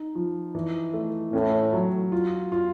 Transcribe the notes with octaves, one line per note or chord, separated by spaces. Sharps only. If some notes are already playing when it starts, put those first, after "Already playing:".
Already playing: D#4
F3
E3
A3
A2 C#4
F#3
F4
F4